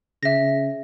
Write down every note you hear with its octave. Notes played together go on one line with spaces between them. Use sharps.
C#3 E5 A#6